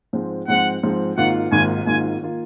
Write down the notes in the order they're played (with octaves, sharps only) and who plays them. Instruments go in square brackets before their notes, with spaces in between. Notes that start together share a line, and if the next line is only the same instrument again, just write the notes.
[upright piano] G#2 F3 G#3 C4
[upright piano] G#2 F3 G#3 C4 [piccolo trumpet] F#5
[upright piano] G#2 F3 G#3 C4
[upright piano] G#1 G#2 D#3 A#3 F4 [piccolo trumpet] F#5
[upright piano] G#1 G#2 D#3 A#3 F4 [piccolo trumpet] G#5
[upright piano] G#1 G#2 D#3 A#3 F4 [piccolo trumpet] G#5
[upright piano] D#3 A#3 F4